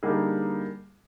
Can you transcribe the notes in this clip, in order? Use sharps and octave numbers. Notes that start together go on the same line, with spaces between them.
D3 G3 A#3 D#4 G#4